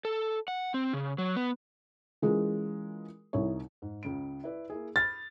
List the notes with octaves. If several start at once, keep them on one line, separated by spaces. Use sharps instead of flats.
A4
F#5
C4
C#3
F#3
B3
E3 G#3 C#4 F4 G#4 A#4
C2 D#4 E4 C#5
G#2
C#2 C#3 D7
E4 B4 D5
A#3 E4 G#4
B5 F6 A6